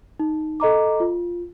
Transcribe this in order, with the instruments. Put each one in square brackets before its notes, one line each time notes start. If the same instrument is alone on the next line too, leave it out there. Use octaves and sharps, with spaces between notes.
[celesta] D#4
A4 D#5 A#5 D6
F4